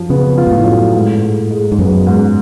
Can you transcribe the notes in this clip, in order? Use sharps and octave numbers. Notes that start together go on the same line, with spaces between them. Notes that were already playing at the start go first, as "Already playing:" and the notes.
Already playing: F#2 F3 F4
C#3 B3
F4
G#2
A2
F#2
G#2
G#2
G#3
G#2
F#2 B3
G#2